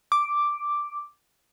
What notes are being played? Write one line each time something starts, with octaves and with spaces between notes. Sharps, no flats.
D6